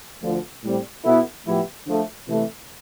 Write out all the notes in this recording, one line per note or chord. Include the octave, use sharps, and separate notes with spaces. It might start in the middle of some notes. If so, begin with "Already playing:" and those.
D2 D3 F3
A2 G3 C4
B2 B3 E4 A4
A2 F3 B3 E4 G4
D3 F3 A3
C3 E3 A3